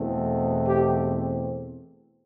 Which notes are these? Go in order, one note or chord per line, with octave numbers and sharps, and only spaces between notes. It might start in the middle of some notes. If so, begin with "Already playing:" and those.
Already playing: E2 B2 A3 C4
G4